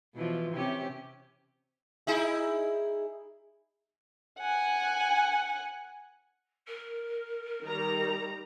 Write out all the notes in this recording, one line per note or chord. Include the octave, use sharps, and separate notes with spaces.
B2 E3 F3
C3 C#4 G4
D#4 E4 G#4
F#5 G#5
A#4
D#3 G3 A#5